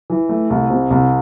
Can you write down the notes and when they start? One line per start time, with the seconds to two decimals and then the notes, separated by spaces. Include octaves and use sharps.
0.10 E3
0.29 A3
0.50 C2
0.70 C3
0.90 C2